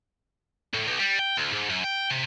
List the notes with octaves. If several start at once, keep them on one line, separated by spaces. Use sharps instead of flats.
A2
B1
G3
G5
D2
G#2
F#2
G5
C3